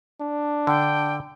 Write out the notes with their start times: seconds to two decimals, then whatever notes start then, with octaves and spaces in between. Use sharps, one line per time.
0.21 D4
0.67 D3 G5